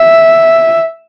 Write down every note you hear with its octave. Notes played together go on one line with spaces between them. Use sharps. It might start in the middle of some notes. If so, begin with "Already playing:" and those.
Already playing: E5